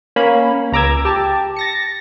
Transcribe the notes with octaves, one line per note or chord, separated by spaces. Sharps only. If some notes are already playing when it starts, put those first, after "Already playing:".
A#3 C#4 B5
C#2 A#5 D6 E6 G#6
G4 A5
A6 A#6 C#7